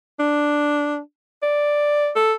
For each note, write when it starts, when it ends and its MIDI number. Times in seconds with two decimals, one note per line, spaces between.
0.19 0.99 62
1.43 2.10 74
2.16 2.33 69